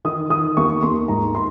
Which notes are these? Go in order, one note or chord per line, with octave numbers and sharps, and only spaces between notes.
D#3 D#6
D#3 D#6
D#2 C#6
D#2 C6
G#2 A#5
C6